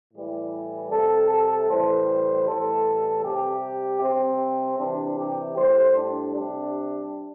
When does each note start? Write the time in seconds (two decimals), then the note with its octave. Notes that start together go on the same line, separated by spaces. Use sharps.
0.14 A2 E3 G3
0.91 C3 G3 A4
1.31 A4
1.69 A2 E3 G3 C5
2.47 A2 E3 G3 A4
3.24 C3 G3 G4
4.01 C3 G3 C4
4.79 C3 E3 G3 D4
5.18 G4
5.57 A2 G3 C5
5.96 D4
6.35 C3 G3 D4